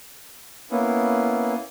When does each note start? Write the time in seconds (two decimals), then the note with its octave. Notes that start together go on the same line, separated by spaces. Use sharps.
0.71 A#3 B3 C#4 E4